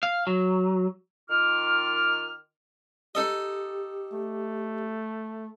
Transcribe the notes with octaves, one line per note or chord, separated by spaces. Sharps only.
F5
F#3
D#3 F4 D6 F6
D#4 G4 A4 D#5
A3